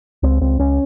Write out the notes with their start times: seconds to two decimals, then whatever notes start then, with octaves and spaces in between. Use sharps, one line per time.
0.23 C#2 C4
0.41 C#2 C4
0.59 C#2 C#4